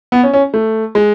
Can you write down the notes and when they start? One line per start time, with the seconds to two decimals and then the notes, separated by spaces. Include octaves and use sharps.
0.12 B3
0.23 C#4
0.34 C#4
0.54 A3
0.95 G#3